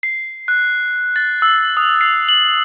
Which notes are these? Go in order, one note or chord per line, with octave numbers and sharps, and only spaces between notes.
C7
F#6
A6
E6
D#6
C7
F#7